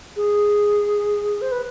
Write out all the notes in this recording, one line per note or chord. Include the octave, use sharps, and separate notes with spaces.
G#4
C5
B4